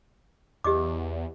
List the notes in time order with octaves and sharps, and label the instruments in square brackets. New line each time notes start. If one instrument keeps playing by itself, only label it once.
[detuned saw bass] E2 [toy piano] G4 D#5 D6